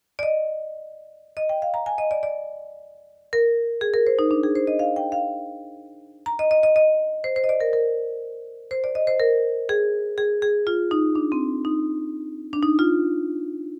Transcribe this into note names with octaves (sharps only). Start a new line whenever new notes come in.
D5
D#5
D#5
G5
F5
A#5
G#5
D#5
D5
D5
A#4
G#4
A#4
C5
D#4
D4
G#4
C5
D#5
F5
G5
F5
A#5
D#5
D#5
D#5
D#5
C5
C5
D#5
D5
A#4
A#4
C5
D5
D#5
C5
A#4
G#4
G#4
G#4
F4
D#4
D4
C4
D#4
D4
D#4
F4